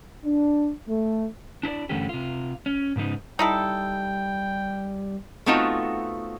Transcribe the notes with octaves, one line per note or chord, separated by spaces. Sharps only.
D4
A3
D4 E4 C#5 D5
G2 D3 E3 A3 C#4 G4
C3 F4
C#4
G#2 C#3 B3 D#4
G3 D#4 E4 A4 G5
A3 B3 C4 D#4 F4 F#4